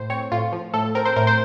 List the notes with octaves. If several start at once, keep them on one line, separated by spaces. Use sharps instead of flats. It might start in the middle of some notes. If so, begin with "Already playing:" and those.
Already playing: A2 C5
C4 C#5
A2 F4
F3
A2 A4
C4 A#4
C5
A2 A#4
C5